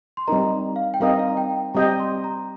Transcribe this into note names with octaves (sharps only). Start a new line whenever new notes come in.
C6
G3 C4 D#4 A#4 D#5 A#5
F5
G5
G3 C4 D#4 A#4 D#5 F5
F5
A#5
G5
G5
G3 C4 G4 D#5 G5 A#5
C6
A#5